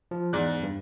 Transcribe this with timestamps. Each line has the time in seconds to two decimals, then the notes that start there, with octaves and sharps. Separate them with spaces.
0.11 F3
0.33 E2 G#2 D5 F#6
0.63 G2